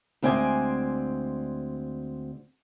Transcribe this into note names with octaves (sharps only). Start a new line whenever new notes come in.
D2 G#3 C4 D5 G#5